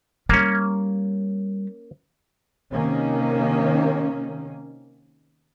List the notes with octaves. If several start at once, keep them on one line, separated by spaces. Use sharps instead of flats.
G3 A#3 C#4
C3 D#3 A#3 C#4